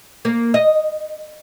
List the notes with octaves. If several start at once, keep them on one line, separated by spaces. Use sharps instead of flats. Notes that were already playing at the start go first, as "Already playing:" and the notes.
A#3
D#5